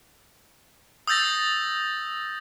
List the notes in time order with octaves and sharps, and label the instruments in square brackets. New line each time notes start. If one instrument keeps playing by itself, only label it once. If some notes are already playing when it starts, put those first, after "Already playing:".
[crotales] D#6 E6 G6 A6 A#6